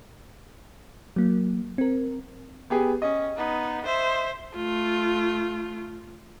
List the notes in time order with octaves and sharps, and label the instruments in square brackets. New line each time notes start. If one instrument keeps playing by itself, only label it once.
[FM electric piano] F#3 A#3
C4 A#4
[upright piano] B3 G4 G#4
[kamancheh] C#4 [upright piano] D#5
[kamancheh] B3 D#4
C5 E5
[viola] A3 F4